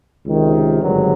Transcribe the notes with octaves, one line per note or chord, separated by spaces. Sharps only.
C#2 C3 D#3
G#1 G2 D3 F#3